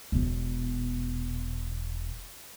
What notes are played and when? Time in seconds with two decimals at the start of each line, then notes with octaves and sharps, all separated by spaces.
0.12 E1 B2